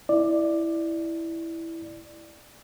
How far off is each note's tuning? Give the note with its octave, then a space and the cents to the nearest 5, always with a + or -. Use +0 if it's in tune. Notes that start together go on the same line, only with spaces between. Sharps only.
E4 +0 D5 +15